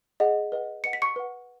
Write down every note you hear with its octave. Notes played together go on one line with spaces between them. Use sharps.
G#4 D#5 F#5
B4 D#5 F#5
B4 D#5 F#5 C#7
B6
C#6 C#7
B4 F#5